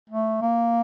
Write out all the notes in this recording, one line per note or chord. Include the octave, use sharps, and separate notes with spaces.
A3
A#3